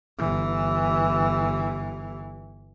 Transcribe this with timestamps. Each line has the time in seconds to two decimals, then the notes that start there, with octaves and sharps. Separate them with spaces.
0.18 G1 E3